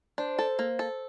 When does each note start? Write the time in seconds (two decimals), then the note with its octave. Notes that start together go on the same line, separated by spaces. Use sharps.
0.18 D4 C5
0.39 A4
0.59 A#3
0.79 A4